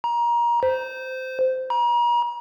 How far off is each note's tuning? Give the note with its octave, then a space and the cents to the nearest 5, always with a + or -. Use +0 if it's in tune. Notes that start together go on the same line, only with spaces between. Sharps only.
A#5 +25
C5 -15
A#5 +40